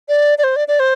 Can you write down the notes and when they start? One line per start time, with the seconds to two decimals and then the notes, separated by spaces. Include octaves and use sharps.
0.09 D5
0.38 D5
0.44 C5
0.56 D5
0.68 D5
0.80 C5